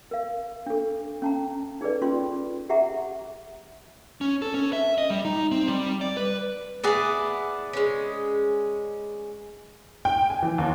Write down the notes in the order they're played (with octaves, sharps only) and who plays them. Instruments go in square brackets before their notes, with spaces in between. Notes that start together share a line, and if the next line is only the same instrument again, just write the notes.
[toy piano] A#4 F5
D4 A4
C#4 A5 A#5
D#4 G#4 A4 B4 D5
C#4 F4 C6
G4 G#4 E5 F#5 A#5
[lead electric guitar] C#4
A4
C#4
E5
D#5
G3
D#4
C4
G3
D5
B4
[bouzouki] B3 E4 [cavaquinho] G#4 B4 D5
[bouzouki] G#3 C#4
[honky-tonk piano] G5
G#5
E3
D#2